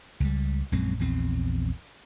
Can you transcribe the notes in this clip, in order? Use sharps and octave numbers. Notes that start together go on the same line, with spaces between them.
C#2 G3
A#1 F#2 G#3 C4
A#1 E2 C4